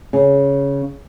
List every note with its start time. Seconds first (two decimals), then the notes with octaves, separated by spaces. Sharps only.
0.13 C#3